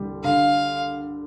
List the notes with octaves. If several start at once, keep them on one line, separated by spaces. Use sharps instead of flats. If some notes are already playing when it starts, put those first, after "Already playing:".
Already playing: C2 D3 G3
D3 F5